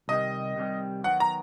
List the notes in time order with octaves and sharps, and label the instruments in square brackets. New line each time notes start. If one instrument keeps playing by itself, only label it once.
[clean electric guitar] C2 C3 D#3 G3 [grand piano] D#5
[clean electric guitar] C2 C3 D#3 G3
[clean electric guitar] D#3 F#3 B3 [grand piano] F#5
[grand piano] A#5